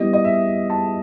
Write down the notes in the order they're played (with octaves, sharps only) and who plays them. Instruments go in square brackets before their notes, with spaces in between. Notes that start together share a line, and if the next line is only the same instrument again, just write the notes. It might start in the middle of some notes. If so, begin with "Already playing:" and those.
Already playing: [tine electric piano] G3 B3 E4 G4 [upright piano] D#5
[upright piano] D#5
E5
A5